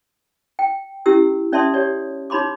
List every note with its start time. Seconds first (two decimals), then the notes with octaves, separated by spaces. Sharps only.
0.59 G5
1.06 C#4 E4 G4 E6
1.52 C#4 D5 E5 A5 C6 D#6
1.74 G4 C#5 D5
2.30 D#4 C#5 B5 C6 D6